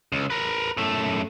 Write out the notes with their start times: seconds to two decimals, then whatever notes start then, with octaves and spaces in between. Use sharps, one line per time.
0.12 C#2
0.30 A#4 B4
0.77 F#2 A3